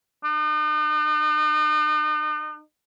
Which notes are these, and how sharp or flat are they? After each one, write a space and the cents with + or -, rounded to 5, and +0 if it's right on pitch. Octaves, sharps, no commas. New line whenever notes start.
D#4 -45